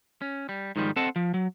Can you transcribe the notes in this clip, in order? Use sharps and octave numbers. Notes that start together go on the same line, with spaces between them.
C#4
G3
G#2 D#3 F3 G3
C4 A4 D#5 F#5 A5
F3
F#3